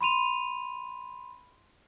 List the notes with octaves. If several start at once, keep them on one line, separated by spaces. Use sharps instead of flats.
B5 C6 D#7 F7